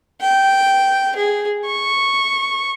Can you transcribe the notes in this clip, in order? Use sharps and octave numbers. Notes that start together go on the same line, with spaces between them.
G5
G#4
C#6